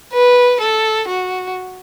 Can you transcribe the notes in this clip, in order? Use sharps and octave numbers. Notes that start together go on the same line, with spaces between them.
B4
A4
F#4